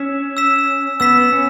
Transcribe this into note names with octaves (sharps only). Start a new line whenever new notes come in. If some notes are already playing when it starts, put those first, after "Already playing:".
Already playing: C#4 E6 B6 E7
E6 B6 E7
B3 E6 B6 E7
C#4